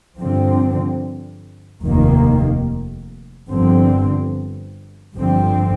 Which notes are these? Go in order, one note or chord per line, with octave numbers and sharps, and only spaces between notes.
G2 D3 F3 C4
F1 D#2 D#3 A#3
G1 G2 D3 F3 C4
G1 G2 D3 F3 C4